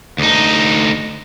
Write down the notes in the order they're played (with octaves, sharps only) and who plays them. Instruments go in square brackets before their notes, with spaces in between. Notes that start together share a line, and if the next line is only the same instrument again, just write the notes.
[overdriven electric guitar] D2 D#4